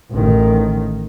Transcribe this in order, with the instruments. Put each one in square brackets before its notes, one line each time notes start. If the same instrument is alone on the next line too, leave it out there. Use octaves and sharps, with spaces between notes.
[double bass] A1 D#3